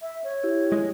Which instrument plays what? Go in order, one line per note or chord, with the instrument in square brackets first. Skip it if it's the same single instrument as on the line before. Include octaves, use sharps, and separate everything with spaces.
[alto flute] E5
C#5
[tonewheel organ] E4 G4
[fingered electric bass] G#3